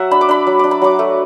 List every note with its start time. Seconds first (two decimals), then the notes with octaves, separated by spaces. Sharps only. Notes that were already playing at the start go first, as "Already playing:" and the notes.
Already playing: F#3 E5 F#5
0.11 D4 B5
0.21 D6
0.29 D4 B5
0.47 F#3
0.59 D4 D6
0.71 B5
0.82 F#3 D6
0.99 A3